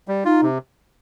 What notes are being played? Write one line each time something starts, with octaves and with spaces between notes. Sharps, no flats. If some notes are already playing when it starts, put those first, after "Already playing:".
G3
D#4 F4
C3